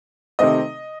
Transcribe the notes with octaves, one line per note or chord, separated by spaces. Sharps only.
C3 D#3 A3 C4 D#5